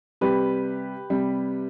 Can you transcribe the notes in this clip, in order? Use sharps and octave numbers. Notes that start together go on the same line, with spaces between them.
C3 G3 G4 B4
C3 G3